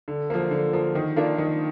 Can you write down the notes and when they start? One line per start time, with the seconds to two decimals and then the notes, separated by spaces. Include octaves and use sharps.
0.08 D3
0.30 F3 A#3
0.51 D3
0.73 F3 A#3
0.95 D#3
1.16 A#3 D4 F4
1.38 D#3